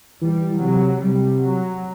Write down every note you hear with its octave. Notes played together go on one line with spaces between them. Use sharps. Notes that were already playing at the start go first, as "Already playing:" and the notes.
E3 G3
C3 F#3
C3 G3
F#3